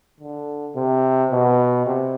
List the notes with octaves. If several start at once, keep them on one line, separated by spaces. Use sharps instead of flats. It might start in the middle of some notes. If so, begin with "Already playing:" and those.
D3
C3
B2
C3